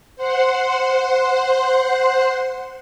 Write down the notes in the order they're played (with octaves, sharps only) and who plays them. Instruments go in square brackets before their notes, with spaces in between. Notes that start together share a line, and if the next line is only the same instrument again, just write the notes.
[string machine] C5 F#5 C6